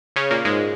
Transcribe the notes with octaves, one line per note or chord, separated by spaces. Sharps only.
C#3 C#4
A#2 A#3
G#2 G#3